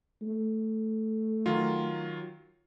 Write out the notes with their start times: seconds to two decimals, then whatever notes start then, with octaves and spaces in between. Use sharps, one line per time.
0.22 A3
1.46 D#3 F#3 F4